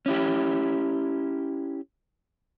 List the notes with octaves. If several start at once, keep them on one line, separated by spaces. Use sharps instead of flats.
C#4 E4 G4